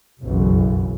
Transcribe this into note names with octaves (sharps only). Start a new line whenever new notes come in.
F1 B1 F#2 C#3 E3